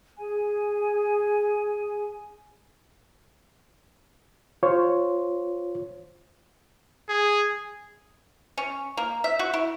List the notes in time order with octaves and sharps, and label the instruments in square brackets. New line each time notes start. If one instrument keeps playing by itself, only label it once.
[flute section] G#4 G#5
[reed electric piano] F4 C5 C#5
[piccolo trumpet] G#4
[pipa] C#4
A#3
E5
F#4
E4